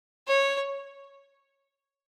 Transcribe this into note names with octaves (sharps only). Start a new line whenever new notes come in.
C#5